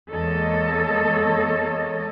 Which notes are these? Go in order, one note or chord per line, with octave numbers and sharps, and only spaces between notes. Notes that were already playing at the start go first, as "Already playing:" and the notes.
E2 G#3 A#3 A4 C#5 D#5